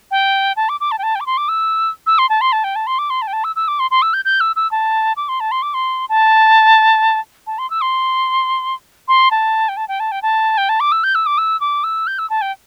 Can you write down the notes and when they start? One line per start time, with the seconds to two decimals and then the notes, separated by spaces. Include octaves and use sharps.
0.11 G5
0.57 A5
0.69 D6
0.80 D6
0.91 A5
0.99 G5
1.03 A5
1.15 G5
1.20 D6
1.26 C6
1.37 D6
1.49 E6
2.07 E6
2.18 C6
2.29 A5
2.41 C6
2.52 A5
2.64 G5
2.76 A5
2.87 C6
2.99 D6
3.10 C6
3.22 A5
3.27 G5
3.33 A5
3.44 E6
3.56 E6
3.68 D6
3.79 C6
3.91 C6
4.02 E6
4.14 G6
4.25 G6
4.41 E6
4.56 E6
4.71 A5
5.17 D6
5.29 C6
5.40 A5
5.51 C6
5.62 D6
5.74 C6
6.09 A5
7.47 A5
7.58 C6
7.70 E6
7.81 C6
9.08 C6
9.31 A5
9.69 G5
9.77 A5
9.88 G5
10.00 A5
10.12 G5
10.22 A5
10.58 G5
10.69 A5
10.80 D6
10.92 E6
11.04 G6
11.15 E6
11.26 D6
11.38 E6
11.61 D6
11.84 E6
12.07 G6
12.19 E6
12.30 A5
12.42 G5